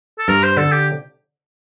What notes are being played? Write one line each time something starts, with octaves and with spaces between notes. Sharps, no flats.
A4
G2 A#4
C5
D3 A4
G4